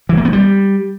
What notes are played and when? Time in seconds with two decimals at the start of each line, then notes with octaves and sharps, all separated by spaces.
0.09 E3
0.17 A#3
0.25 B3
0.33 G3